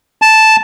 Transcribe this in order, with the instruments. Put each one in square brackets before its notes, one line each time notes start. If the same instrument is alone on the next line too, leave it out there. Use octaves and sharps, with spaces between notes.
[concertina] A5